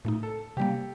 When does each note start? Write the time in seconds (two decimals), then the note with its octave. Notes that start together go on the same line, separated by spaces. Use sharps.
0.05 A2 A3 D#4
0.23 A4
0.57 C3 G3 A#3 G4